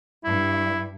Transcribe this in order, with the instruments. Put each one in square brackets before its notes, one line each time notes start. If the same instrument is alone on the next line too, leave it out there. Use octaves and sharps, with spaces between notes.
[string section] G2 [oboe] E4